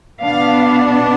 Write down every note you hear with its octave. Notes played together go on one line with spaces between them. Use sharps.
B2 B3 D4 F5